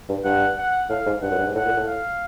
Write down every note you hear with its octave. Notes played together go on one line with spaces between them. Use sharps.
G2
G2 F#5
F#5
A2 F5
G#2
G2 F#5
F#2
G2
G#2
A2 F#5
A#2
A2
F5